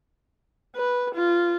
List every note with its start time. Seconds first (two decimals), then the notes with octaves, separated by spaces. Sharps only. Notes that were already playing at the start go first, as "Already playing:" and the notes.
0.76 B4
1.15 F4